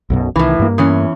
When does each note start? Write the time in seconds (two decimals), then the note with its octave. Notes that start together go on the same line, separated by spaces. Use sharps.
0.10 B1 F#2 B2
0.36 C2 A2 D#3 E3
0.59 G2 A#3
0.78 E2 E3 C#4